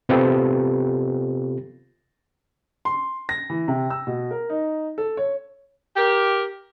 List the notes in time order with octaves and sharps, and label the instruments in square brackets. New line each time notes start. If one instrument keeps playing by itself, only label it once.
[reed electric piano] C3 B3 C4 F4 G4 A4
[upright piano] C6
A#6
E3
C3
E6
B2
A#4
D#4
A4
C#5
[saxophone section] G4 A#4